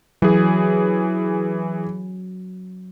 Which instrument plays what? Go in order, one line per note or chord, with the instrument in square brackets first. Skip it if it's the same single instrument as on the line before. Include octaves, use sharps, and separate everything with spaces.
[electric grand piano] E3 G#4 [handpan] F#3